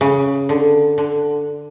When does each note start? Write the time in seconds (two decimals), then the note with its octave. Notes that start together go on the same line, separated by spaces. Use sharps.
0.01 C#3
0.49 D3
0.98 D3